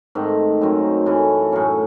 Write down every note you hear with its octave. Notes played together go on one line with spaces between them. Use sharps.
G#2 D#3 A3 C4
F#2 D#3 F#3 C4
F#2 E3 A3 C#4
A2 F#3 C#4